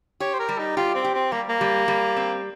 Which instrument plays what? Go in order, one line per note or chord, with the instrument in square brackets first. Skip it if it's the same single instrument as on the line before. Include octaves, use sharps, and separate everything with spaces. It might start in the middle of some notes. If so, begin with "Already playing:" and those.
[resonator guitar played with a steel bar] G4 [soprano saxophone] C#5
[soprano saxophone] C5
A#4
[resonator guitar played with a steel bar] G3
[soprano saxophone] D#4
[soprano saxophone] F4 [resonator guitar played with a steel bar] G4
[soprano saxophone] C4
[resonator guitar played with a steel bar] G4
[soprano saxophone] C4
[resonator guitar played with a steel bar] G3 [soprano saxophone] A#3
[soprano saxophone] A#3
[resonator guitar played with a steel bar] G3
G3
C4